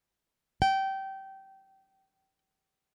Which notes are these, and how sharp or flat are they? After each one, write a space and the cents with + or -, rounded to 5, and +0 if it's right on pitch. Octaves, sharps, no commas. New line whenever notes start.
G5 -20